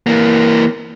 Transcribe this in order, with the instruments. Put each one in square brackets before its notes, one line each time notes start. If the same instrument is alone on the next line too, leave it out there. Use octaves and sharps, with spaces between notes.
[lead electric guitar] E3 A#3